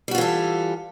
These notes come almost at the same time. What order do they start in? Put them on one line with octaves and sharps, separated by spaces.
G3 F#4 F4 E3 A4